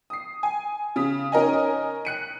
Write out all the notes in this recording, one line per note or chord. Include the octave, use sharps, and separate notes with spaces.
D#6 C7
G#5
C#3 D#6 B6
C#4 D#4 A#4 D#5 G#5
F#6 C#7 D#7